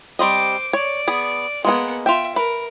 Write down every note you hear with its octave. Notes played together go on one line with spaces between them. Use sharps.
G3 C4 C5 D#5 D6
C#5 D5
B3 G#4
G#3 A#3 B3 G#4 F#5
F4 E5 G5
A#4 B4